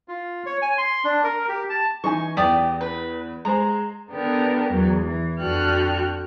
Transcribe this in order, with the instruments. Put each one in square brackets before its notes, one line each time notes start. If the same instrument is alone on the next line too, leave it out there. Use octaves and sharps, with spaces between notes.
[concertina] F4
C#5
G#5
C6
D4
A#4
G4
A5
[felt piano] E3 D#4 G#5 [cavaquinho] C#6
[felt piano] E2 B6 [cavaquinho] G4 D5 D#6
[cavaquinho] B4
[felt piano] G#3 G#4 C5 [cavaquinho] A#5
[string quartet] D3 B3 G4 A#4
E2 F#3
E3
F2 D3 F#4 G5 F6 F#6